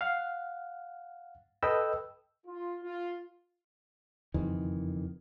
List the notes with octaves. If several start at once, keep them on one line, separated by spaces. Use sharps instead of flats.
F5 F#5
A4 B4 D#5 G5 E6
F4
F4
F#1 F2 D#3 E3